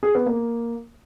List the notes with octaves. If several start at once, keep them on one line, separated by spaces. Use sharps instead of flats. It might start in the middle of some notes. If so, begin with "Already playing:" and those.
G#4
B3
A#3